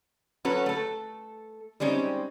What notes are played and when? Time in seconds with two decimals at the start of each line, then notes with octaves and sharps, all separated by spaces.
0.45 F#3 C#4 F#4 A4 B4
0.66 A3 A4
1.80 G3 G#3 C4 C#4 D#4